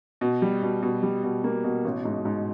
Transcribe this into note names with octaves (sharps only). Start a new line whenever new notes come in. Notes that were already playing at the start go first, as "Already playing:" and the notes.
B2
G3
B2
B2
G3
B2
A#3
B2
A1
G#2
G#2